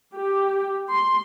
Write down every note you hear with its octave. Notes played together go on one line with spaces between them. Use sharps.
G4
C6